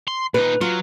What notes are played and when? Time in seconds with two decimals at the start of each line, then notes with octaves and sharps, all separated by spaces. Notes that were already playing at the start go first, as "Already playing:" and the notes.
0.08 C6
0.34 A#2 D#4 B4
0.61 F#3 F4